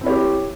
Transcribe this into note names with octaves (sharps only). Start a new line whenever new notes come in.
C4 E4 G4 C#5